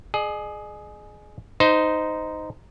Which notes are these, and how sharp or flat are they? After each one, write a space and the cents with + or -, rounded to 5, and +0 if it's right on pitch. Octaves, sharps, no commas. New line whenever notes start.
G#4 +20 D#5 -45
D#4 +0 C5 -20